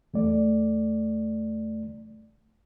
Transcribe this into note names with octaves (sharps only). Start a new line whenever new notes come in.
E2 A3 D5